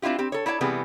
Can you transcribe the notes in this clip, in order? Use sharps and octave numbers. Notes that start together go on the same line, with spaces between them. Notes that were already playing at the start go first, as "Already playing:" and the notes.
C4 D4 E4 F4 G4
C4 G4
A4 C#5
E4 C#5 D5 F5 A5
C3 E3 G3 B3 G#4